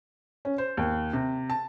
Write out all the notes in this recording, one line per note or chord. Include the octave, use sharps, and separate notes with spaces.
C#4
C5
D#2
C3
A5